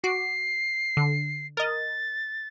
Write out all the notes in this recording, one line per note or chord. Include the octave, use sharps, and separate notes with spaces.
F#4 D6 C7
D3
A#4 D#5 A6